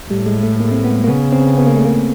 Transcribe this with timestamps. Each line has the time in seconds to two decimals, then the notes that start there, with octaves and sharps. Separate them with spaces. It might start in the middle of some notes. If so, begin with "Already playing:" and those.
0.10 A2 G3
0.26 G#3
0.43 A3
0.60 A#3
0.71 C4
0.84 B3
1.04 A#3
1.08 C#3 B3
1.32 C4
1.57 B3
1.66 A#3
1.75 A3
1.85 A#3